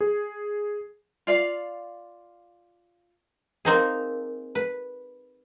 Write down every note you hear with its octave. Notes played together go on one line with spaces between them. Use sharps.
G#4
F4 D5 F5
A#3 C4 D#4 G#4
B4